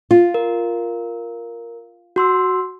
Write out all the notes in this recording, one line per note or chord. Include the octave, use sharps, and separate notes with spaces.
F4
A#4
F#4 C6 E6